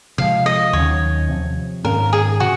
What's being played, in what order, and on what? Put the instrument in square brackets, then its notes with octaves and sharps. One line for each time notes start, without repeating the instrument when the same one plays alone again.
[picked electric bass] C3 F3 G#3 [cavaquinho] F5
[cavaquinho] D#5
[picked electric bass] D#2 D#3 F#3 C#4 [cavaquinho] C#5
[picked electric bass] C3 F3 C4
[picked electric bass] G#2 D#3 A#3 C#4 [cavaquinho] A#4
[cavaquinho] G#4
[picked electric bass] C3 [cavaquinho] F#4